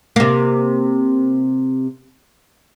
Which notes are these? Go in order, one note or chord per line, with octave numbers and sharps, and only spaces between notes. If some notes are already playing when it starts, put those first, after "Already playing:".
C3 A#3